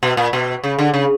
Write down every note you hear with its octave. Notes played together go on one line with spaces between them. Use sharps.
B2
A#2
B2
C#3
D3
C#3